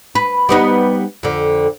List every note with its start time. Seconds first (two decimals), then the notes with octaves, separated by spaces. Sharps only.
0.15 B4
0.49 G3 B3 D#4
1.23 F2 D3